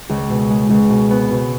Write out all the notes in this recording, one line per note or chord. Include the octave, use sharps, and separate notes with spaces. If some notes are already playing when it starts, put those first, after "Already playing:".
C#2
B2
G#3
C#2
B2
B3
B2